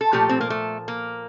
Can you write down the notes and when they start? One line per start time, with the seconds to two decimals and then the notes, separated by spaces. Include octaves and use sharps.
0.01 A4
0.12 A#2 F3 A3 G4
0.29 C4
0.41 A#3
0.50 A3
0.88 A#3